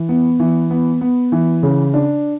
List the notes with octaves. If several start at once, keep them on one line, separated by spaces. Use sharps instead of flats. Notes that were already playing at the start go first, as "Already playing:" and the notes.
Already playing: E3
B3
E3
B3
B3
E3
C#3
D4